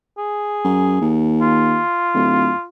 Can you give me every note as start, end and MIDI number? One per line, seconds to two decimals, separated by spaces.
0.18 1.18 68
0.64 1.01 42
1.01 1.80 39
1.41 2.66 65
2.14 2.51 26